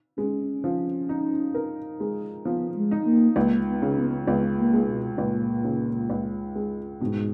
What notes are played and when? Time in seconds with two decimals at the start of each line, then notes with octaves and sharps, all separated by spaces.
0.18 G#3 C#4
0.64 F3
1.09 D#4
1.55 A#4
2.00 G#3
2.45 F3 B3
2.76 G#3
2.91 D#4
3.06 A#3
3.36 C#2 A#3
3.67 B3
3.82 C#3
3.97 B3
4.27 C#2 B3
4.58 A#3
4.73 G#3
4.88 B2
5.18 C#2 A#2
5.64 C#3
6.10 C#2
6.55 G#3
7.00 G#2 B2